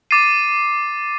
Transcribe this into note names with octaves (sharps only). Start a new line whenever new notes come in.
D6 A6 C7 D#7